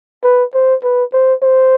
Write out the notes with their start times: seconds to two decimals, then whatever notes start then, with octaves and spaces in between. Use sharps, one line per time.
0.24 B4
0.54 C5
0.83 B4
1.13 C5
1.42 C5